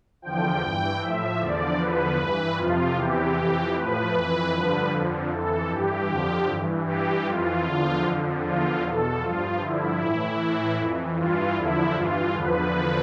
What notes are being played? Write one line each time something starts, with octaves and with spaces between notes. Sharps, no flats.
E2 D3 F3 G5
G2 E3
A2 F3 E5
E2 D3 F3 D5
E2 D3 F3 B4
G2 E3
F2 C3 F3 F4
E2 C3 E3 G4
F2 E3
A2 F3 B4
F2 E3
G2 D3 F3
F2 D3 F3
F2 E3 A4
G2 E3 G4
F2 D3 F3
G2
E3
G2 E3 G4
F2 E3 F4
E2 D3 F3
F2 D3 F3
E2 D3 F3 F4
E2 B2 A4
G2 F3 F4
G2 D3 F3 E4
A2 E3 E4
A2 E3
F2 E3
G2 E3 F4
E2 D3 F3 E4
G2 E3 F4
E2 D3 F3 B4